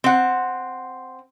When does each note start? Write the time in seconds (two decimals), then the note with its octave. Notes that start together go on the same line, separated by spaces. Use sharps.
0.04 C4 F#5